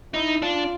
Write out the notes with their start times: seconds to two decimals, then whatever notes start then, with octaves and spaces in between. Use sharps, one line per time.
0.14 D#4 E4
0.42 D4 F4